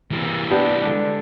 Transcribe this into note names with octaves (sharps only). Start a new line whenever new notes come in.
C3 E3 G3 A#3
B3 D4 G4
D3 G#3 D4